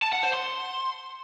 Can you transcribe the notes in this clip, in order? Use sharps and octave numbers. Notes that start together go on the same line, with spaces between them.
A5
F#5
C5
C6